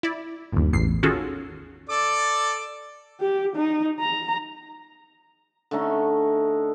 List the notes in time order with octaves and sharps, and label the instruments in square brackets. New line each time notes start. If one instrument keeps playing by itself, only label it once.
[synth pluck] E4 D5
G1 D#2
A1 E2 C7
D#3 C#4 F4 F#4 G#4 A4
[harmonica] A4 D5 D6
[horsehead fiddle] G4
D#4
A#5
[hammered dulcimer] D3 A3 C#4 D#4